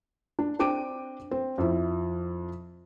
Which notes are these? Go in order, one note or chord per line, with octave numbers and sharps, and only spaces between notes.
D4
C4 D4 G5 D6 D7 D#7
C4
F2 E4